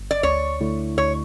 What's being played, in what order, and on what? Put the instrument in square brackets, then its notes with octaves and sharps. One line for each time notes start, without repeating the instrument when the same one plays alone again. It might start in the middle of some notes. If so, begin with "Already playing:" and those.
Already playing: [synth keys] G1
[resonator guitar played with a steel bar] D5
[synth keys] D2 [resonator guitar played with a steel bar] C#5
[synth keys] D3 A3 E4
[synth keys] D2 [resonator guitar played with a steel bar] C#5